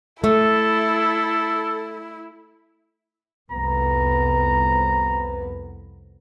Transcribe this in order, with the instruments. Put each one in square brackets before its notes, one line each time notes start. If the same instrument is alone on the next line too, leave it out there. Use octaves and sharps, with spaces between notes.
[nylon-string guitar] A3 [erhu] E4 [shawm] A4
[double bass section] C2 F2 B3 [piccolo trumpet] A#5